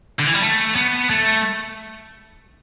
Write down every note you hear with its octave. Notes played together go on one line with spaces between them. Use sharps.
D3
E3
G3
A3
B3
A3